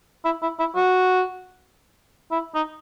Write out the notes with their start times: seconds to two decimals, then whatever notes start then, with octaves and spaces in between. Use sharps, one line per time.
0.25 E4
0.42 E4
0.59 E4
0.76 F#4
2.31 E4
2.54 D#4